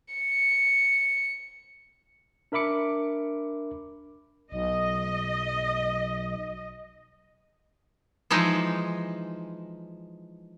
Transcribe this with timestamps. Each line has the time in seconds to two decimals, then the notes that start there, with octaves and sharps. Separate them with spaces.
0.14 C#7
2.52 D4 A#4 E5 B5 D6 C#7
4.52 B1 D#5
8.31 E3 F3 G#3 D#4